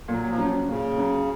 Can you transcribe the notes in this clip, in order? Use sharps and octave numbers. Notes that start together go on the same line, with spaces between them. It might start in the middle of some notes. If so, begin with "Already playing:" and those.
A#2 F#3
F#3
F3
F#3 C#4
A#2 C#3
F#3 C#4